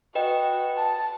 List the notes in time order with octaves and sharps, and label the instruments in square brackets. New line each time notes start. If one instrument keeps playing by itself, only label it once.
[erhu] F#4 [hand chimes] B4 D#5 G5
[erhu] A5